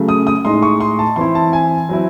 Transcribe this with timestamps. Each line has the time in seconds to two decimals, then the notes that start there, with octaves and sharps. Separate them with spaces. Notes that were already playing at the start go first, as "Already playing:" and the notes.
Already playing: C#3 F#3 A3
0.09 D#6
0.27 D#6
0.45 A2 G#3 D#4 C6
0.63 C#6
0.80 C6
0.99 A5
1.16 E3 C4 E4 C6
1.35 A5
1.53 G#5
1.89 F#3 C4 E4